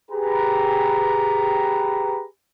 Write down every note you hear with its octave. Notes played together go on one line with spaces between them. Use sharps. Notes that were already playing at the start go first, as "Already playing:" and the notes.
G4 G#4 B4 A#5